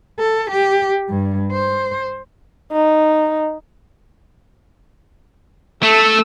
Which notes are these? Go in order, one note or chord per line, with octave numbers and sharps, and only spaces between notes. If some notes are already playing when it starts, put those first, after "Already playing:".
A4
G4
G2
C5
D#4
A3 A4 E6